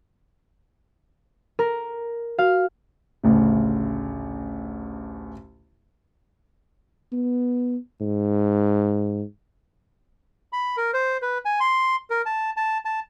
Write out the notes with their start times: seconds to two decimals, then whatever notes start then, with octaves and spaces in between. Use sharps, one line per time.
1.59 A#4
2.39 F#4 F5
3.24 A1 D2 C#3
7.13 B3
8.01 G#2
10.53 B5
10.77 A#4
10.94 C5
11.22 B4
11.45 G#5
11.60 C6
12.10 A#4
12.26 A5
12.57 A5
12.85 A5